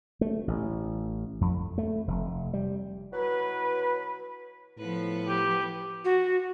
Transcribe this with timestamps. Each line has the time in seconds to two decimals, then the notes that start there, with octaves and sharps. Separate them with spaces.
0.21 A3
0.48 A1
1.41 F2
1.78 A3
2.08 F1
2.54 G3
3.13 B2 F#3 E4 B4
4.78 A2 F3 B3 B4
5.28 G4
6.05 F#4